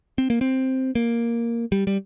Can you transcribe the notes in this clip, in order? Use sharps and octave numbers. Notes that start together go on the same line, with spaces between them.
C4
A#3
C4
A#3
G3
G3